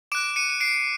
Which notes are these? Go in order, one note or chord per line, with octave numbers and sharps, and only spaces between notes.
D6 F#6 D7 E7
C#7 D#7
D#7
C7 D7